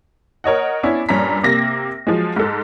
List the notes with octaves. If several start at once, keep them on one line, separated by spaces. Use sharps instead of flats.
A#4 C#5 D#5 F#5
B3 C#4 D4 E4
G2 A#2 C#4 A#5 B6
C3 A#3 A#6
F3 F#3 G#3
G#2 A4